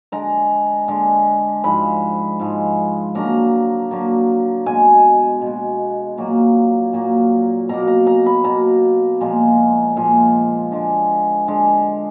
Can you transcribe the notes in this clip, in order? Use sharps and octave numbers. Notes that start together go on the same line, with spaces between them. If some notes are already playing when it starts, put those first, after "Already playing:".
D3 G#3 A#5
D3 G#3
G#2 F3 G#3 B5
G#2 F3 G#3
D3 F#3 A#3 A#5
D3 F#3 A#3
B2 G#3 G#5
B2 G#3
A#2 F#3 A#3
A#2 F#3 A#3
B2 A#3 A#5
A#5
A#5
B5
B2 A#3 A#5
A#2 F3 G#3
A#2 F3 G#3 G#5
D3 G#3
D3 G#3